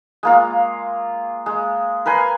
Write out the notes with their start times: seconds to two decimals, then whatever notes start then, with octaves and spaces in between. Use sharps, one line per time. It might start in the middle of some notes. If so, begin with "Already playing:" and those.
0.23 G#3 A#3 F4
1.46 G#3
2.06 A#4 B4 G#5 C6